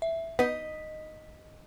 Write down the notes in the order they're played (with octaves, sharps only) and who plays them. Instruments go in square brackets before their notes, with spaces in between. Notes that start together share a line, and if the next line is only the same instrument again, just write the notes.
[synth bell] E5
[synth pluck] B3 [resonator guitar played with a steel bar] D#4 D#5 [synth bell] B6